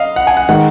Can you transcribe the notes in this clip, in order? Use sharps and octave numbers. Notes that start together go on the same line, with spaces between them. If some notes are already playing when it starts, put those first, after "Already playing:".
Already playing: D#5 F5
F#5
G#5
F#5
D#3 G#3 F#5